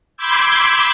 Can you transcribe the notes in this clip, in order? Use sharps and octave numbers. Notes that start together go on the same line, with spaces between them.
B5 C6 D6 E6 G6 G#6